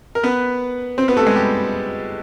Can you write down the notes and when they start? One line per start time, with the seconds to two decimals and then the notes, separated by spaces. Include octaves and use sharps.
0.15 A#4
0.23 B3 B4
0.98 C4 C5
1.08 B3 B4
1.17 A3 A4
1.26 G#3 G#4
1.36 G3 G4